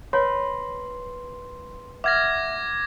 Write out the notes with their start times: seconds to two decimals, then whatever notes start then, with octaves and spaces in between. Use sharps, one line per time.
0.13 A#4 B4 C#5 C6
2.04 E5 F#5 D6 F6 G#6 A#6